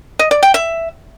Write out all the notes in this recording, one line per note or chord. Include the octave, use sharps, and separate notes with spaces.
D#5
D5
G5
E5